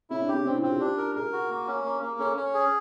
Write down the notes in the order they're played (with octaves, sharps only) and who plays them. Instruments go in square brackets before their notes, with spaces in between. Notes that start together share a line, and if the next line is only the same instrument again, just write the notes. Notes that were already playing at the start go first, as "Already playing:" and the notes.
[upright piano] C#4 [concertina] E4
[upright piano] D4
[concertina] G4
[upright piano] C#4
[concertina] C4 [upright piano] D4
[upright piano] E4
[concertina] C4 [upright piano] F4
[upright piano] G4
[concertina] D4
A#4
[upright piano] G#4 [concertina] A#4
[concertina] F#4
A#3
C#4
A#3
A#3
[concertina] C#4 [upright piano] A4
[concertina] C#4
G#4